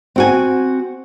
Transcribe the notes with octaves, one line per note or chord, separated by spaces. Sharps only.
C4 F#4 G#5